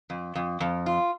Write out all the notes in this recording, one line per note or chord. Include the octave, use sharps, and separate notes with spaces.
F2
F2
F2
F4